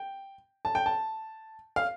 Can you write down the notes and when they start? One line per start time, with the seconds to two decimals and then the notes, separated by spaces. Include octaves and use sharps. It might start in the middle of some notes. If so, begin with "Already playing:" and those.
Already playing: G5
0.65 A5
0.75 G5
0.86 A5
1.76 F5